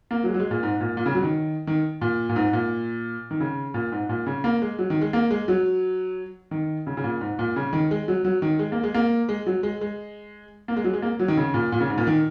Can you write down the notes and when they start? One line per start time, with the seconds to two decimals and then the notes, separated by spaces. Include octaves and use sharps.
0.11 A#3
0.24 F#3
0.29 G#3
0.34 F#3
0.40 G#3
0.51 A#2
0.63 G#2
0.81 A#2
0.97 A#2
1.06 C#3
1.15 F#3
1.23 D#3
1.67 D#3
2.01 A#2
2.29 A#2
2.36 G#2
2.53 A#2
3.31 D#3
3.40 C#3
3.74 A#2
3.92 G#2
4.09 A#2
4.27 C#3
4.44 A#3
4.62 G#3
4.79 F#3
4.90 D#3
5.01 G#3
5.13 A#3
5.31 G#3
5.48 F#3
6.51 D#3
6.87 C#3
6.97 C#3
7.04 A#2
7.21 G#2
7.39 A#2
7.56 C#3
7.73 D#3
7.91 G#3
8.08 F#3
8.25 F#3
8.42 D#3
8.59 G#3
8.72 A#3
8.83 G#3
8.94 A#3
9.29 G#3
9.46 F#3
9.63 G#3
9.81 G#3
10.68 A#3
10.76 G#3
10.84 F#3
10.93 G#3
11.02 A#3
11.19 F#3
11.28 D#3
11.37 C#3
11.54 A#2
11.72 A#2
11.81 C#3
11.89 G#2
11.98 A#2
12.07 D#3